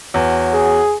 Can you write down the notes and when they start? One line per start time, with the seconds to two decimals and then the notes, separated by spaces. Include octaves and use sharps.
0.14 E2 F#3
0.53 G#4